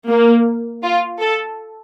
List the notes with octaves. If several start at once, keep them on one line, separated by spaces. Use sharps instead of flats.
A#3
F4
A4